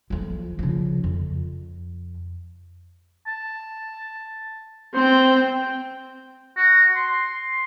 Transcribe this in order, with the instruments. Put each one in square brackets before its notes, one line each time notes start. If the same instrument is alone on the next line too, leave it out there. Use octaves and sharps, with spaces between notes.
[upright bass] F2 F3
C#3 F3
F2
[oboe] A5
[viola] C4 G5 [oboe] C5
[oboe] F#4
C6